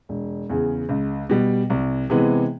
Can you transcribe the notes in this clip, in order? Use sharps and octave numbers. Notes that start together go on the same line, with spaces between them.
E1
E2 C#3
C#2
B2 G3
C2
C3 E3 G#3 B3